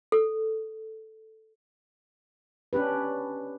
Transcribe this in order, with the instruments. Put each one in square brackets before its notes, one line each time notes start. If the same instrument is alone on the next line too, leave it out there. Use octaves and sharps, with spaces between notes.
[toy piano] A4
[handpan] C#4 D4 G4 B4